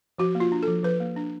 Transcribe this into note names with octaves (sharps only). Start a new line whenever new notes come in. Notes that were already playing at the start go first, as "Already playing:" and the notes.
F3 F#4
A#3
F4
D4
A4
F3
F3 B4
A#3
D4